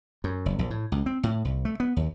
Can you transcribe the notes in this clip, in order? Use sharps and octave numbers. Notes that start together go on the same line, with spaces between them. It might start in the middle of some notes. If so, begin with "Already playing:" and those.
F#2
F#1
A#1
A2
C#2
C4
A2
C2
A3
B3
D#2